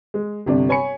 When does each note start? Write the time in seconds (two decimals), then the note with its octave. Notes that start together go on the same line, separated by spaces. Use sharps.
0.14 G#3
0.46 G1 C3 D4
0.69 C#5 G#5 B5 C#7